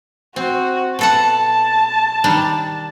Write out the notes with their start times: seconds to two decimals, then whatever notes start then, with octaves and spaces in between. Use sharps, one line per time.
0.36 C4 F#4
0.99 B2 A4 F#5 A5
2.24 D#3 G3 D4